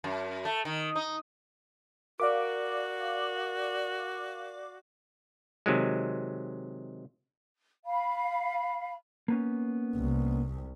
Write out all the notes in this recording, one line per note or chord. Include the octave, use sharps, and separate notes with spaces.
F#2
A3
D#3
D#4
F#4 A#4 D5 F5 D6
C3 D#3 F#3 G#3
F5 B5
A#3 B3 C#4
C2